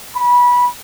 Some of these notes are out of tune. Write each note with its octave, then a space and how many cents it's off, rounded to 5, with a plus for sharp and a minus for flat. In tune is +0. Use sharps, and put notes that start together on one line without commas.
B5 -20